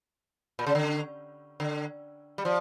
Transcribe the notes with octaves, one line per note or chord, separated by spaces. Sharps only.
A#2
C#3
D3
D3
G3
F3